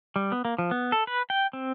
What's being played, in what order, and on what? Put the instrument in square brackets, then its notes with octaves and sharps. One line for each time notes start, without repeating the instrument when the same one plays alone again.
[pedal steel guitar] G3
B3
A#3
F3
B3
A4
B4
G5
C4